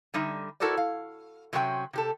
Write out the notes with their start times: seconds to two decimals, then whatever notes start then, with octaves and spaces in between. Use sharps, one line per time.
0.14 D3 G3 D#4 E5
0.60 E4 F#4 A4 A#4 C5 D5
0.77 F5
1.53 C3 F#3 C4 C#4 C5 G5
1.93 C3 G4 A4